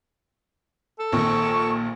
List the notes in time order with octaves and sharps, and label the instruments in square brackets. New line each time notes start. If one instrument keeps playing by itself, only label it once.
[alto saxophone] A4
[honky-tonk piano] A#1 A#2 D#3 [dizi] C#6